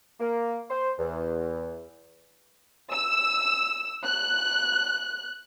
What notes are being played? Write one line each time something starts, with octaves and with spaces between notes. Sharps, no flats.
A#3
C5
E2
E6
F#6